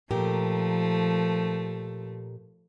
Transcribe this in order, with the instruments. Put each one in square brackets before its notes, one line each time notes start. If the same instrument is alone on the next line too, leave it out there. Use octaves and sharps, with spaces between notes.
[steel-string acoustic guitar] A#2 G4 A#4 [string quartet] F3 A3